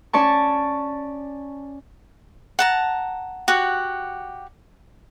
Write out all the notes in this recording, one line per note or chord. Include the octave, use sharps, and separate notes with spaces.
C#4 D5 A5 C#6
F#5 A5 A#5
F#4 G4 F#5